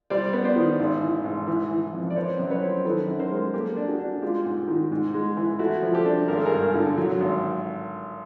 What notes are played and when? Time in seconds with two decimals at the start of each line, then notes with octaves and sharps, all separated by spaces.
0.10 G3 C5 D5
0.33 B3
0.44 C5 D5
0.56 D#3
0.79 G#1
1.02 E3
1.24 G#2
1.47 E3
1.71 E3
1.93 F2
2.10 D5
2.16 C4 B4 C#5
2.39 F#2
2.50 B4 C#5
2.62 C4
2.85 D#3 A4 B4
3.08 F#2
3.19 A#4 C5
3.31 G#3
3.54 A#3 G4 A4
3.77 D4
3.88 F#4 G#4
3.99 D4
4.22 G#3 F4 G4
4.45 G#2
4.68 D#3
4.92 G#2
5.14 G#3
5.37 E3
5.59 A3 E4 F#4
5.82 F3
5.94 G4 A4
6.05 D4
6.28 G#1 A#4
6.37 A4
6.46 G#4 A#4
6.51 G2
6.74 D3
6.98 F#3
7.20 G#1